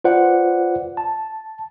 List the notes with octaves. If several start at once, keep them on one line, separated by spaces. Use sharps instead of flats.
F4 B4 C5 D5 F#5
A5